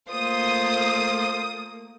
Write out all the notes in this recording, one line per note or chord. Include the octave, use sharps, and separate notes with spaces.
A3 A#3 F4 C5 D#6